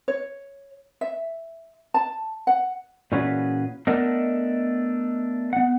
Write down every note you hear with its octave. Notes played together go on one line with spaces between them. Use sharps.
C#5
E5
A5
F#5
A#2 E3 C#4 F#4 G#4 B4
A3 B3 D4 A4 A#4 D#5
B3 F#5